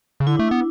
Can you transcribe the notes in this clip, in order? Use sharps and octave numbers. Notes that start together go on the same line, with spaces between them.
C#3
D3 E4
A3 D4
B3 E4